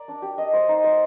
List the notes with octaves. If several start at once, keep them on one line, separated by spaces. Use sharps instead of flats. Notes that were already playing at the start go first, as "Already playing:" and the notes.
Already playing: A#4 D5
D4
G4
D#5
C5
D#4
C5